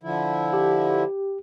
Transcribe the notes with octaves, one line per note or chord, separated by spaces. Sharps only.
D3 F3 E4
G4